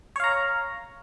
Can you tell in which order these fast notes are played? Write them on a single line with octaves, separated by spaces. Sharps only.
C#5 F5 A#5